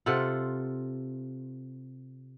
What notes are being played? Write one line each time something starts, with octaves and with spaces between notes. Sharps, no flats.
C3 F4 A4 F#5